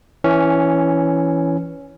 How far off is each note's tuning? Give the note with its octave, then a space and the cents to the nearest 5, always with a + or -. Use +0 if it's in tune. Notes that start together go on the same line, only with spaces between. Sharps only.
E3 +0 C#4 +5